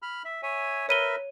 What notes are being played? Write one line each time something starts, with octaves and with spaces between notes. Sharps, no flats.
B5 F6
E5
C#5 E5 G#5
A#4 B4 C#5 E5 D#7 G7